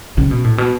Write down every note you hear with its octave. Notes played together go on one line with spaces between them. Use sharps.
C#3
B2
A2
B2